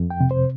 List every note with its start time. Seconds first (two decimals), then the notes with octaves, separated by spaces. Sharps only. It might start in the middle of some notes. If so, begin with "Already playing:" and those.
Already playing: F2
0.10 G5
0.20 C3
0.31 C5